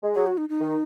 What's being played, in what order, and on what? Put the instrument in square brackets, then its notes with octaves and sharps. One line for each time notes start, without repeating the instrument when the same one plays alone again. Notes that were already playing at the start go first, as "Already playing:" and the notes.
[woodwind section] G#3
[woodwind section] F#3 [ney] G#4
[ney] F#4
D#4
D#4
[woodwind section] D#3